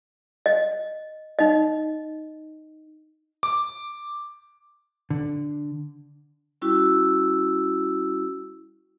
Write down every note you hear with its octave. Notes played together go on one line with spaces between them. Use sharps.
D#5
D#4 D#5
D6
D3
G3 C#4 E4 F#4 E6